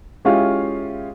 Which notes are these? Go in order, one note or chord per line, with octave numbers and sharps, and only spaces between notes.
G#3 C#4 E4 F4 G4 F5